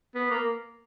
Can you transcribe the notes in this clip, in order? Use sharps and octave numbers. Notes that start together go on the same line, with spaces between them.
B3
A#3